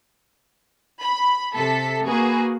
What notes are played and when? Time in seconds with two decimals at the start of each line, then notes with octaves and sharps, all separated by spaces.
1.02 B5
1.54 C3 A4 B6
2.06 A#3 F#4 G#4 B4